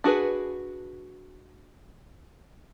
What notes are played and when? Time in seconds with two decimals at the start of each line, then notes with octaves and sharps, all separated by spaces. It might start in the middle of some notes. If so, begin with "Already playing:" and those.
0.04 D4 F#4 G#4 B4